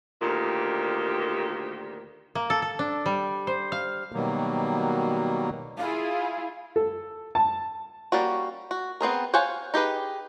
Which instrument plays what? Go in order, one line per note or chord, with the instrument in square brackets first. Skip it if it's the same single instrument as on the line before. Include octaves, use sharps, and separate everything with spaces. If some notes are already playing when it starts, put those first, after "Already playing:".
[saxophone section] D2 A#2 D#3 G4
[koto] A#3
A4
A4
D4
G3
C5
F5
[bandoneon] B2 D#3 F#3 G3 A#3
[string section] E4 F4 G#4 [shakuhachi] F5
[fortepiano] A4
A5
[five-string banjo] G3 A#3 C#4 F#4
F#4
B3 C4 G#4 A#4
C5 C#5 F5 F#5 G#5
D#4 G4 G#4 B4